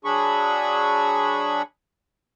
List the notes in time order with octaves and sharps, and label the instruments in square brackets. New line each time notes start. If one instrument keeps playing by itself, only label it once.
[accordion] F#3 D4 G#4 B5 C#6